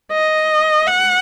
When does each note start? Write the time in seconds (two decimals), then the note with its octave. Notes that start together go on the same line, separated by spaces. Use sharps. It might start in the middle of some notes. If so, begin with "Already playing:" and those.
0.12 D#5
0.87 F#5